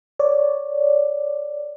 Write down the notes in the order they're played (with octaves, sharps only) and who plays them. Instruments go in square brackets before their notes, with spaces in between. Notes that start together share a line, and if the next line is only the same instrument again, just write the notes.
[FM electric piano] C#5 D5